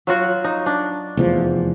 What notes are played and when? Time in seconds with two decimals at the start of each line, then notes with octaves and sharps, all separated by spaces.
0.07 F#3 F4 F#4
0.44 D#4
0.66 D4
1.17 F1 E2 F3